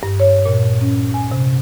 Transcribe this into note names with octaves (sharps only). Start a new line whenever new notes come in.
G2
C#5
A#2
C#4
G#5
C3